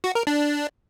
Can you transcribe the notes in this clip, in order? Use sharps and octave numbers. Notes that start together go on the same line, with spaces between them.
F#4
A#4
D4